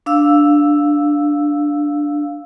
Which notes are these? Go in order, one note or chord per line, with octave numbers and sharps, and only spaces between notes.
D4 F5 E6